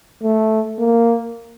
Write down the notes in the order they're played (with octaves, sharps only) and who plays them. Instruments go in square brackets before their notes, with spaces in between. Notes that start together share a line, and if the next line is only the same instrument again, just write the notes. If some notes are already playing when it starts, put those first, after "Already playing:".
[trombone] A3
A#3